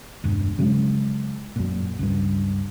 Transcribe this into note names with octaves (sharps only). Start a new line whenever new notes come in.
E1 G2
C#3 F#3 G#3
F#2 A#2
C#2 G2